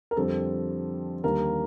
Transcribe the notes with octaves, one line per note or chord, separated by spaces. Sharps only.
A#4
F2 D3 G3 C4 A4
D#2 D3 G3 A#3 A#4